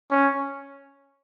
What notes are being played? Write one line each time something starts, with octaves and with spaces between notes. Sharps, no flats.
C#4